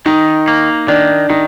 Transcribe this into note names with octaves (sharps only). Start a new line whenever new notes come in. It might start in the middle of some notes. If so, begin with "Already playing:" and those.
D#3 D#4
A#3
D#3 D4
D#3 D#4